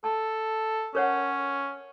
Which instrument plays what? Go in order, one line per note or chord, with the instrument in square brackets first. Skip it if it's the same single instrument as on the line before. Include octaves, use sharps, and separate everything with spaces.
[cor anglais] A4 [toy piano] A5
[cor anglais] C#4 [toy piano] A#4 C#5 F#5